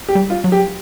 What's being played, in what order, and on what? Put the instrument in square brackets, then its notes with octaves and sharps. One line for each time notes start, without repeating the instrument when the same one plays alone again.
[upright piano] G4
[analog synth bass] G3
[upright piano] F4
[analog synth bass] F#3
[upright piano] G4